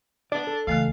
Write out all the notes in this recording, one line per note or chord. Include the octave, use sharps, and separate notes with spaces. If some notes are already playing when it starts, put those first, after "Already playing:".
B3 D4 D5
A4
C#2 E3 A3 F5 F#6